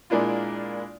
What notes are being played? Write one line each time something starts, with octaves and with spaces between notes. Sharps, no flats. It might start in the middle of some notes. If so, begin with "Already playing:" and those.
A#2 G#3 A#3 D4 E4 F4